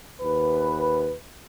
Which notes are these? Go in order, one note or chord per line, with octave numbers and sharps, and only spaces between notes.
D#2 B4